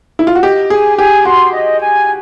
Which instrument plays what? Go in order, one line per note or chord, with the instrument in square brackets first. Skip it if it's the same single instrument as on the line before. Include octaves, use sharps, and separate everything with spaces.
[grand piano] E4
F4
F#4
[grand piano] G4 [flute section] D#5
[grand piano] G#4 [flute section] G#5
[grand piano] G4 [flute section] G#5
[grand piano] F#4 [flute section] C6
[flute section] D#5
G#5